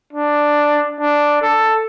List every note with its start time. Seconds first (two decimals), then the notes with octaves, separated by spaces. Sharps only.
0.13 D4
1.00 D4
1.41 A4